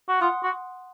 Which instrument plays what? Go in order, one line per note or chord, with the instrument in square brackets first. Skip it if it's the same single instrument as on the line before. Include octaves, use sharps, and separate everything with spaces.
[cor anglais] F#4
[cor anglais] F4 [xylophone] F#5 C6 D#6 F#6
[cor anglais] F#4